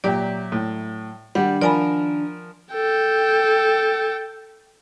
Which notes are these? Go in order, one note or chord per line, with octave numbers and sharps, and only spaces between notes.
A#2 F#3 G4 D5 E5 G5
A2
D#3 G3 D4 F#5
F3 A#4 D5 G#5 B5
A4 G5